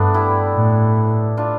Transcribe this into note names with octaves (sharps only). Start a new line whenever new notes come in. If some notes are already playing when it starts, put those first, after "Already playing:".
Already playing: G2 A3 B3 D4
E4 G4
A2
D4 F4